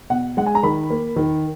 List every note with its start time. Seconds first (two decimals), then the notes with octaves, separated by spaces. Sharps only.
0.10 B2 F#5
0.37 G#3 F#5
0.46 G#5
0.55 A#5
0.63 D#3 B5
0.90 A#3
1.16 D#3